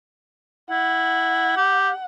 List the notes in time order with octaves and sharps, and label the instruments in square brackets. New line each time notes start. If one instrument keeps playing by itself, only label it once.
[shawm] E4 [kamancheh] F#5
[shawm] G4